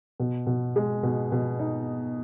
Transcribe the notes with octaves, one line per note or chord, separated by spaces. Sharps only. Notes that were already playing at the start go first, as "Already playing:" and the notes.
B2
B2
G#3
B2
B2
D#4